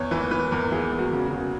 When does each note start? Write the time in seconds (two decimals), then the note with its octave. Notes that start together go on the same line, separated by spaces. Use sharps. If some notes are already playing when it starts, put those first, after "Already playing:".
Already playing: E2 C#5
0.11 E3 B4
0.31 E3 B4
0.52 E2 A#4
0.72 E3 G#4
0.92 E2
0.99 F#4
1.13 C#3
1.26 F#4
1.32 C#3